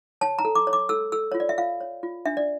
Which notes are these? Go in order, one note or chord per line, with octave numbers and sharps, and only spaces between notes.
C#5 A5
A#5
A4
D6
C#5
D6
A4 E6
A4 E6
F4 C#5
D5
E5
F4 F5
C#5
F4
D4 E5
D5